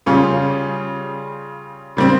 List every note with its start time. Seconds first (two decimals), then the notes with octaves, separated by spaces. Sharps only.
0.06 C#3 G3 C#4 F4 G#4
1.97 C#3 G3 C4